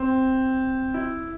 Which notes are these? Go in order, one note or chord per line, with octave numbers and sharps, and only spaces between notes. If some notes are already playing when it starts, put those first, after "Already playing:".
Already playing: C4
E4